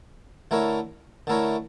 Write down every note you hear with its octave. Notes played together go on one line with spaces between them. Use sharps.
D3 A3 E4 A#4 C#5
D3 A3 E4 A#4 C#5